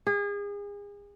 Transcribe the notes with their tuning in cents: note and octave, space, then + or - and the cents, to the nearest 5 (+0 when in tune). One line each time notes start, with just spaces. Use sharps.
G#4 -35